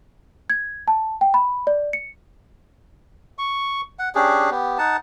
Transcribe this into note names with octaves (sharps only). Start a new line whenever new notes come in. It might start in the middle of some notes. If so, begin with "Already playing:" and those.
G#6
A5
G5
B5
D5
C#7
C#6
F#5
C#4 D4 G4 G#4
B3 G4
D#4 F#5 A5